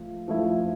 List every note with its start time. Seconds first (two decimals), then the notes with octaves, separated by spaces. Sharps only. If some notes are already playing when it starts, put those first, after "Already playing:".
Already playing: F3 A3
0.28 F3 A3 E4